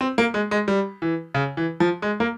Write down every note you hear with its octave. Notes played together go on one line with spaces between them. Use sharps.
C4
A#3
G#3
G#3
G3
E3
C#3
E3
F3
G#3
A#3